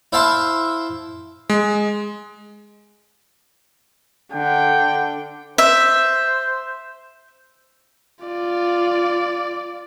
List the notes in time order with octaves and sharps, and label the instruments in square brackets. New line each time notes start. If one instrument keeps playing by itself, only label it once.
[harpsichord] E4 C5 E5 F5 A5 C6
[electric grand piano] G#3
[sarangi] D3 [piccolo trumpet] G5
[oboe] C5 [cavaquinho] E5
[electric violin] F4 D5